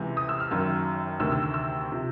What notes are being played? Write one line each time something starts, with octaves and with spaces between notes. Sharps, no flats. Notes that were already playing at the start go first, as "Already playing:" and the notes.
Already playing: C#2 C3 E3
D#6
E6
F6
F#1 F#2 D#3 E6
D2 C3 D#3 E6
E6
E6
E6
C3 F3